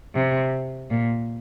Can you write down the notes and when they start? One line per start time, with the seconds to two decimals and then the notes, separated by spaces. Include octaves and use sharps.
0.15 C3
0.91 A#2